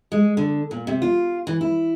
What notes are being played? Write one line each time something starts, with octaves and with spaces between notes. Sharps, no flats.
G#3
D3
A#2
C3
F4
E3
E4